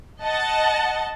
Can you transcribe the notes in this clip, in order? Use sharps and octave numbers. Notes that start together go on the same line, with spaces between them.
D#5 F#5 A5